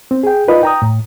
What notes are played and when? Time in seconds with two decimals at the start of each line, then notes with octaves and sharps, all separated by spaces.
0.11 C4
0.23 G#4 G5
0.48 D#4 F4 A#4 B4 D5 D#5
0.63 G5 A#5 D#6
0.82 A2